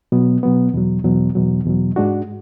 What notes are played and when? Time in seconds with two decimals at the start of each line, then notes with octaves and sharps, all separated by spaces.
0.12 B2 F#3 B3
0.43 B2 F#3 B3
0.74 E2 B2 F#3
1.04 E2 B2 F#3
1.35 E2 B2 F#3
1.65 E2 B2 F#3
1.96 G#2 G#3 D4 F#4